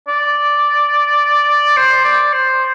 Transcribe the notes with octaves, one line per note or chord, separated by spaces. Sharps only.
D5
C5
D5
C5